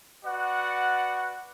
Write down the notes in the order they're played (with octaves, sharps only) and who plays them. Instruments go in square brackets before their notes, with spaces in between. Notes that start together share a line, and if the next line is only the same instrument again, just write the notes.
[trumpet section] F#4 B4 D5 F#5